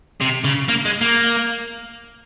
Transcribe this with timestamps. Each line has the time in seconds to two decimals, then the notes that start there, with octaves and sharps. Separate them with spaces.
0.21 C3
0.44 C#3
0.69 A#3
0.85 G#3
1.01 A#3